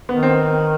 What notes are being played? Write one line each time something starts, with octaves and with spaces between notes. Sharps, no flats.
D#3 B3
C4